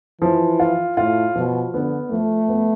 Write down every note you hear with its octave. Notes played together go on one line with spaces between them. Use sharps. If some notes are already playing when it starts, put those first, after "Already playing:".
E3 F3
F4
A2 F4
B2 F3
D3 B3
F3 A3
B3